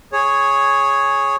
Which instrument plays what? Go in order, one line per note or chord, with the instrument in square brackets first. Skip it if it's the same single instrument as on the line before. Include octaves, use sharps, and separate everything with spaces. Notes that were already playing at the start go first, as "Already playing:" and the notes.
[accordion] G#4 C#5